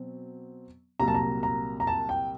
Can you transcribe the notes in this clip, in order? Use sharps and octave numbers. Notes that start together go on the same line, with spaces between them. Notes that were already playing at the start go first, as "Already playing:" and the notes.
Already playing: B2 F#3 C4
C2 A#2 F#3 A#3 A#5
A5
A#5
A#5
A#5
A5
G5